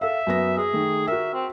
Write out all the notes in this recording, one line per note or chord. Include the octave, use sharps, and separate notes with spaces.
A4 E5 F5
F#2 B3 A#6
G#4
D#3 A3
F#4 A#4 E5
C4